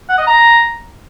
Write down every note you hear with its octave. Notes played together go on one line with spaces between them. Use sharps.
F#5
D#5
A#5